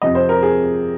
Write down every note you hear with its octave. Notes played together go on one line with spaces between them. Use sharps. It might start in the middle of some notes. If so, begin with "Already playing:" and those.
F2 C3 F3 D#5
C5
A#4
G#4